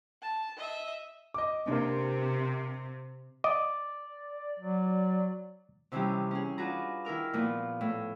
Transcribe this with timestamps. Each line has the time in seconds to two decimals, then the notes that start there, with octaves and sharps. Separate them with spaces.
0.22 A5
0.57 D#5 E5
1.34 D#5 D6
1.67 C3 A#3 D4
3.44 D5 D#5 D6
4.59 F#3
5.92 C3 D#3 E3 G3 C#4 G4
6.31 C#4 G#4
6.58 D4 F4 F#4 G#4 B4 A#5
7.05 D#3 E4 A#4 F6
7.33 A#2 F3 A#3 B3
7.81 A2